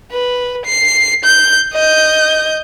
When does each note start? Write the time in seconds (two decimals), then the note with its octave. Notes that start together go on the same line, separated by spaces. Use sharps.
0.12 B4
0.66 C7
1.25 G6
1.73 D#5 G6